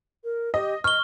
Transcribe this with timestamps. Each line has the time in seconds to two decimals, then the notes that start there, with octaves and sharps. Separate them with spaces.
0.24 A#4
0.54 G4 D#5
0.84 D#5 C#6 F6 G7